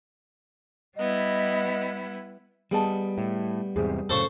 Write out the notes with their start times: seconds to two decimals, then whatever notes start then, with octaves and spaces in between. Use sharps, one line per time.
0.97 G3 B3 E4 D#5
2.71 G3 B3 G#4 D#5 A5
3.18 A2
3.76 E2 G#2 C3 G#4
4.10 F#2 A2 C#3 A4 C5 C#6